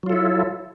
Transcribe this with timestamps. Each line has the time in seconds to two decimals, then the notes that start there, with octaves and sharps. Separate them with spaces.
0.03 F#3
0.06 F4
0.10 A4
0.13 E4